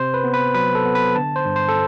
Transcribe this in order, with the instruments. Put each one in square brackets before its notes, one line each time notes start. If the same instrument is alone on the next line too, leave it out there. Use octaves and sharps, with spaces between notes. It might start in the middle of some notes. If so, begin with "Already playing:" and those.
Already playing: [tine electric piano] C3 C5
B4
B3
B4
F#3 B4
A4
B3
B4
D3 A5
C5
G2
C5
A4